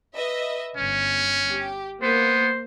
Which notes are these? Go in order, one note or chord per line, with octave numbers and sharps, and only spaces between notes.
B4 D#5 E5
G1 C#4
G4
A#3 B3 C5